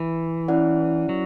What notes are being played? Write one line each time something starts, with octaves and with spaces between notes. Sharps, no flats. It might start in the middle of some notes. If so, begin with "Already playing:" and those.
Already playing: E3
C#4 E4 B4 D5 F#5
F#3